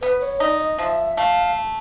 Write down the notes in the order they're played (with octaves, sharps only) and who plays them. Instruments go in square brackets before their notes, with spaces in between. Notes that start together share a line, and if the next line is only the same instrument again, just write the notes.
[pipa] B3 [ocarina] B4
[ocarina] C#5
[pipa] D#4 [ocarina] D5
[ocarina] D#5
[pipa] F3 [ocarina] E5
[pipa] A3 [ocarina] F5